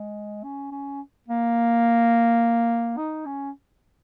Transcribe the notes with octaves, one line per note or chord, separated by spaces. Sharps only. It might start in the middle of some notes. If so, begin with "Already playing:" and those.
Already playing: G#3
C#4
C#4
A#3
D#4
C#4